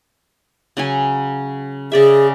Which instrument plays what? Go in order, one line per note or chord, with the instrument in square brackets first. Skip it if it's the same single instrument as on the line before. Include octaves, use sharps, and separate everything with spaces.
[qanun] C#3 F#3 G#5
[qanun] C#3 D5 E5 [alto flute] G#4